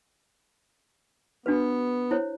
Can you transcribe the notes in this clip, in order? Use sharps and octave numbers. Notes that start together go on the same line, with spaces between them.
B3 D4 F#4 B4
E4 C5 C#5